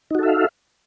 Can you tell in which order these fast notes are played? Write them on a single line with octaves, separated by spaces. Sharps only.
D#4 F#4 A4 E5 F5